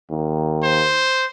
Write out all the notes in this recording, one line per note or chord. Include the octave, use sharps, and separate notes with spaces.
D#2
C5